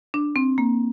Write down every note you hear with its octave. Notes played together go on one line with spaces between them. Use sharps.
D4
C4
A#3